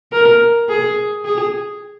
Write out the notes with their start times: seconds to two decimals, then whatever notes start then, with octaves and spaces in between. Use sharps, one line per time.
0.12 A#4
0.69 G#4
1.25 G#4